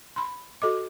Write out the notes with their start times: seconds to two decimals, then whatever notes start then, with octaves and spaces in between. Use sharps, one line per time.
0.16 B5 C6
0.62 F#4 A4 D#5 D6